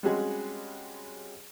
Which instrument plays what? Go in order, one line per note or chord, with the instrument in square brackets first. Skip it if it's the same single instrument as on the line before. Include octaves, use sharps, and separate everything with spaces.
[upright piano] G3 G#3 C4 C#4 F#4 G#4